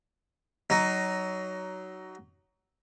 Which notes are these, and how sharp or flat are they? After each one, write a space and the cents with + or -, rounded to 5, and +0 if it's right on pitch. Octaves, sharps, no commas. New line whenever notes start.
F#3 +20 D#4 +0